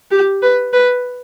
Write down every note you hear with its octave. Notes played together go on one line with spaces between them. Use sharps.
G4
B4
B4